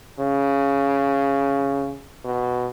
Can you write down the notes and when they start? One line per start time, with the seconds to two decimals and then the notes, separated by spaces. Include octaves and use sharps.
0.20 C#3
2.25 B2